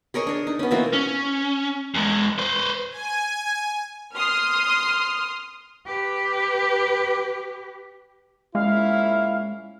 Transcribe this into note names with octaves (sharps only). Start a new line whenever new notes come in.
G#4 A#4 C#5 D#5
D4 C#5
D#4
B3 C#4
B2 E3 A#3 C4
C#4
E2 G#3
B4 C5
G#5
C6 D#6 F6
G4 B4
A#2 G#3 C#4 E4 F5